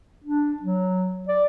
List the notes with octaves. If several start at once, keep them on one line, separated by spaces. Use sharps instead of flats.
D4
F#3
D5